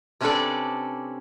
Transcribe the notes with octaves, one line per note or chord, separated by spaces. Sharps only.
C3 C#4 D4 A4 B4 D5